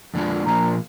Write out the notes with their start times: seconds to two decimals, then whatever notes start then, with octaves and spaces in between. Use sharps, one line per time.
0.14 F2 D3 G#3 D4 F4
0.46 A#2 F3 A#3 D4 F4 A#5